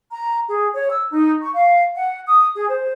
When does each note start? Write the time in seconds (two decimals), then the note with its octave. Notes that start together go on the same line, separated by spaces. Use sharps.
0.10 A#5
0.48 G#4
0.75 C#5
0.90 E6
1.12 D#4
1.42 C#6
1.54 F5
1.96 F#5
2.27 D#6
2.54 G#4
2.68 C5